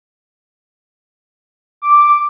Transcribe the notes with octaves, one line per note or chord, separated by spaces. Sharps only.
D6